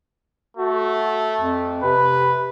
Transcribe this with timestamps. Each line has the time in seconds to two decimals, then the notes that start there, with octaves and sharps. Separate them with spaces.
0.57 A3 F#4
1.40 F2
1.83 C3 B4